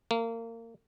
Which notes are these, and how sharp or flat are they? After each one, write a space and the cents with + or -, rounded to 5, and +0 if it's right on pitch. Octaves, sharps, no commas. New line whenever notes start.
A#3 -30